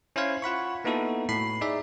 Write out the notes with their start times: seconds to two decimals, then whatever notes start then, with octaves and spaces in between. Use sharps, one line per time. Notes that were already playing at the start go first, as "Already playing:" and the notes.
0.16 C#4 E4 C5 F5 G#6
0.42 F4 F#5 B5 C#6
0.84 A#3 B3 D#4 E4 F#4 A4
1.29 A2 B5 C7
1.61 D#4 G#4 D5 E5